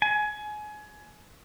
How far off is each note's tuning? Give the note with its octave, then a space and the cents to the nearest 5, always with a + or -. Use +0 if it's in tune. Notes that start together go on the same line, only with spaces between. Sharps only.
G#5 +25